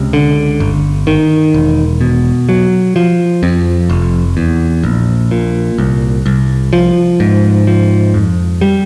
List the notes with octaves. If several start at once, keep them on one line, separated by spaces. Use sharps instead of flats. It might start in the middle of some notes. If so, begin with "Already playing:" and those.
Already playing: C#2 C3
D3
G1
D#3
E1
B2
F#3
F3
F2
F1
E2
A#1
A#2
C2
C2
F3
G#2
F3
F2
G3